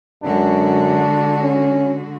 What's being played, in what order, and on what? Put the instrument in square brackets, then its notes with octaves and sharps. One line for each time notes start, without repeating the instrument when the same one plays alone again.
[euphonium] F#2 [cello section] D3 G#3 F#4 [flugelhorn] D4
[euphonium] C#4